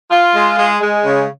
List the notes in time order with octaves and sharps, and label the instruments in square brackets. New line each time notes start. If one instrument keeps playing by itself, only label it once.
[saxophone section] F4
G#3
G#3
G#3
C#3